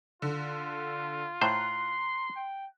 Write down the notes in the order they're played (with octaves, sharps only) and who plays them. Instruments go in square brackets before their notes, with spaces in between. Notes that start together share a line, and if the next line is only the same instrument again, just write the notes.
[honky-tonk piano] D3 [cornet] F4
[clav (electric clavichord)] A2 C5 [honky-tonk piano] A#5 F#6 [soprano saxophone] C6
[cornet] G5